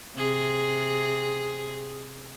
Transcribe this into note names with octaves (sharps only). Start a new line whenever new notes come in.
C3 G#4